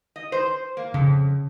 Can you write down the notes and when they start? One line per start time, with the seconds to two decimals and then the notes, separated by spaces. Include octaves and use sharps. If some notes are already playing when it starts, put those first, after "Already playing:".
0.16 D#5
0.32 C5
0.77 A#3
0.94 F2 C#3